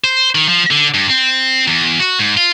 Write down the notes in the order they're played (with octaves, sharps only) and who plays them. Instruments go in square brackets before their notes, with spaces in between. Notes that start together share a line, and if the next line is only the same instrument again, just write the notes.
[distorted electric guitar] C5
D#3
F3
D3
G2
C4
E2
F#4
G#2
F4